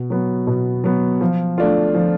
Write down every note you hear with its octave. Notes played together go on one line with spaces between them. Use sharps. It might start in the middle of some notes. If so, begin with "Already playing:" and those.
Already playing: B2
F#3 B3
B2
F#3 B3
F3
A3 D4 F4
F3